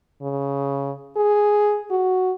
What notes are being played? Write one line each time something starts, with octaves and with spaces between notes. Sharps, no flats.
C#3
G#4
F#4